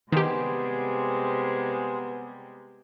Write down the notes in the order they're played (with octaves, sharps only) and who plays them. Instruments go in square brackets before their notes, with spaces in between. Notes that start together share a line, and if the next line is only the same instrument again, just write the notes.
[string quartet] C3 G3 G#3 [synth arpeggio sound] D#3 G4 [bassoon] B3 [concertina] G#4 C5